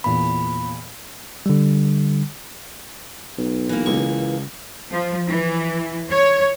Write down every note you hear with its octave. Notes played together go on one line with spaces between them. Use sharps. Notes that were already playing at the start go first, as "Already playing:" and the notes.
E2 A#2 B3 B5
D3 G3
B1
E3 A#3
C#2 C#6
F3
E3
C#5